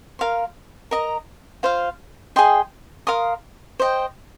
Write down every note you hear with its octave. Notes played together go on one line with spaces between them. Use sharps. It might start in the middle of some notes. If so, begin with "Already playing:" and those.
A#4 F5 C6
A#4 D#5 A#5
F4 C5 F5
G#4 D#5 G5 C6
A#4 F5 C6 D#6
C5 D#5 G5